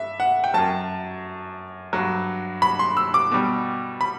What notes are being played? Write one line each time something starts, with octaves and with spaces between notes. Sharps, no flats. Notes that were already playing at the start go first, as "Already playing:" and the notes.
Already playing: G2 E5
F#5
G5
F#2 F#3 A5
G2 F#3
B5
C6
E6
D6
B2 G3
B5